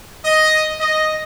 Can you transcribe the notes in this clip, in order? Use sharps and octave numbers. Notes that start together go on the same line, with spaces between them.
D#5
D#5